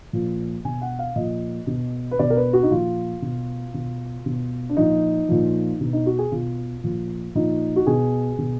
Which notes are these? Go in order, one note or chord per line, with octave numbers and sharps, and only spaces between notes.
A#2 F3
B2 G#5
F#5
F5
A#2 F3 D#5
B2
B4
B2 D5
A#4
B4
F#4
D#4
A#2 F3 F4
B2
B2
B2
D4
A#2 F3 D#4
A#2 F3
B2
D#4
F#4
G#4
B2 F4
A#2 F3
A#2 F3 D#4
F#4
B2 G#4
B2